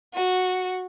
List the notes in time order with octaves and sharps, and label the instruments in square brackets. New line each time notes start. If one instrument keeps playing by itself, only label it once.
[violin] F#4